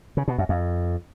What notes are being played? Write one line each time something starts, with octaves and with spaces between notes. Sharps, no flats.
C#3
B2
F#2
F2